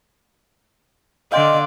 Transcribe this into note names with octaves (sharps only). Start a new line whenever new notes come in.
D3 D5 D#5 F5 G5 C6